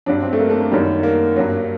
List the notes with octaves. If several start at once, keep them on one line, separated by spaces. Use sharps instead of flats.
G2 F#3 D4
C4
A3
A#3
A3
A#3
F#2 D#3 G3
A#3
G2 F#3